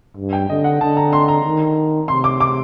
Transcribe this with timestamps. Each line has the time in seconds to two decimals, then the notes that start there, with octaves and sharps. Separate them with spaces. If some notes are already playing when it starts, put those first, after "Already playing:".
0.17 G2
0.33 G5
0.49 D3 D#5
0.64 F#5
0.81 D3 A5
0.97 A#5
1.13 C6
1.28 A#5
1.45 D#3
2.08 C3 C6
2.24 D6
2.41 D6